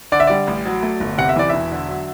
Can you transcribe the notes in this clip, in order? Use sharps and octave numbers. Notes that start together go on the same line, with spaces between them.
D3 D5
E5
G3 D5
A1
F#3
A3
G1
C3 F#5
E5
E3 D5
E1 E5
D3
F#3